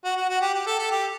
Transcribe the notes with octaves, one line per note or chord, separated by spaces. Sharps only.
F#4
F#4
F#4
G4
G4
A4
A4
G4